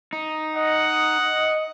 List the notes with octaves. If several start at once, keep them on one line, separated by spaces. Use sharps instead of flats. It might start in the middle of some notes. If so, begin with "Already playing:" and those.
D#4
D#5 F#5